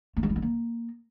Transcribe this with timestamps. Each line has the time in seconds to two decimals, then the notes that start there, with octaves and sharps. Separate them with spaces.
0.17 A3
0.23 G#3
0.29 E4
0.36 G#3
0.42 A#3